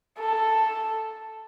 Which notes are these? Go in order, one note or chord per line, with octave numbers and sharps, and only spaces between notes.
A4